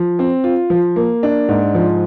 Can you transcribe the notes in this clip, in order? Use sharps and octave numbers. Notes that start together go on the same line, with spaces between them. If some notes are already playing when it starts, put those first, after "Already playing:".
Already playing: F3
C4
F4
F3
A#3
D4
G#2
F3